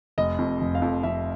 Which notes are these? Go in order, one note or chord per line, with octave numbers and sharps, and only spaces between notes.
F1 D#5
F2
F1
F5
F2
F2 E5